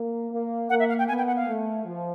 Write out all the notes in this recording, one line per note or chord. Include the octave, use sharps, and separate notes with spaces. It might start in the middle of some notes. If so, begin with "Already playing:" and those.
Already playing: A#3
A#3
A#3 F#5
E5
F5
G5
B3 G#5
G5
F#5
F5
A3
F3